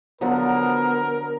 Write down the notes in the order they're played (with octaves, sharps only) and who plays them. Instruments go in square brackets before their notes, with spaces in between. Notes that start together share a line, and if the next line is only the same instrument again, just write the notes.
[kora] D3 F3 F#3 [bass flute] B3 [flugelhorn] A#4